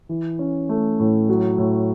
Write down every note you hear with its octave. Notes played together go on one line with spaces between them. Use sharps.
E3
C#4
A3
A2
F#3
A2